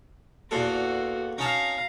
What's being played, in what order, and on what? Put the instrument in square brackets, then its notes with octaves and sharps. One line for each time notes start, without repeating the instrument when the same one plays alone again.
[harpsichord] E2 A#2 A4 [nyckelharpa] F#4
[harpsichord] C#4 D#4 A5 [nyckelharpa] F5 A#5